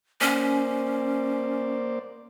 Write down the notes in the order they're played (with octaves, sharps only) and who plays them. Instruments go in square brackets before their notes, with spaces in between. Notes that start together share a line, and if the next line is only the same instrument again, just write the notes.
[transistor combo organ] A#3 C5 D5 [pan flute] C#4